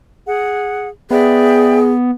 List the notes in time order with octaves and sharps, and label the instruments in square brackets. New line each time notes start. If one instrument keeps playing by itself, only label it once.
[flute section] G#4 F#5
[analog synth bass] B3 [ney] G#4 [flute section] D5 E5 G5